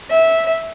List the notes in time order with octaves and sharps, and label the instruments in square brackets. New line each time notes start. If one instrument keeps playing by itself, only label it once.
[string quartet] E5